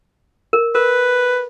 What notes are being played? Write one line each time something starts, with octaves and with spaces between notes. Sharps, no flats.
A#4
A#4 B4